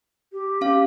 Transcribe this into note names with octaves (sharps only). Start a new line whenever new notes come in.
G4
C#4 G4 F5